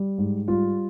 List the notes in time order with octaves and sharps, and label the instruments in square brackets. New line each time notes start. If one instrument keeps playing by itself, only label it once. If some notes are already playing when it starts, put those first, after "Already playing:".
Already playing: [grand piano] G3
G#2
G3 F4